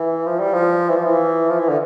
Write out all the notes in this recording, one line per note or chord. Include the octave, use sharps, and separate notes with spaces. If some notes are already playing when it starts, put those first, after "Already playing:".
Already playing: E3
F3
G3
F3
E3
F3
E3
F3
E3
D3